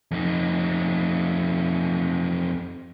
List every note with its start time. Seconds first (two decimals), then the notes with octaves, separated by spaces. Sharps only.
0.11 F2 D#4